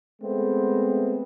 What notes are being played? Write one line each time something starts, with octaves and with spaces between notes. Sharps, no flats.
G#3 A3 B3 C4